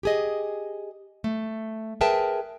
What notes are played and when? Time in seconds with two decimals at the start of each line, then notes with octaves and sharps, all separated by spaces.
0.03 G4 G#4 D#5
1.24 A3
2.01 G#4 A#4 B4 E5 G5 A5